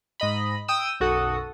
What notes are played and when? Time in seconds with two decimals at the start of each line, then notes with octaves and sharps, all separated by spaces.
0.20 G#2 D#5 B5
0.68 G5 D#6 E6
1.00 B1 F#2 F#4 A4 F#5 D#6